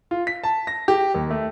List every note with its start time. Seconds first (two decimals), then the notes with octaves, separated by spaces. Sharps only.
0.11 F4
0.27 B6
0.44 A5
0.67 A#6
0.88 G4
1.14 D#2
1.30 A3